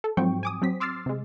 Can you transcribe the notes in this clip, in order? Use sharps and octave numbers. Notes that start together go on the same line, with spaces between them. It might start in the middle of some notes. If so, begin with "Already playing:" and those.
A4
G#2 F3 F#3 C4 G5 C#6
G#5 D6 D#6
F#3 C4 B6
C6 D6 E6 F6 A6 C7
C3 G#3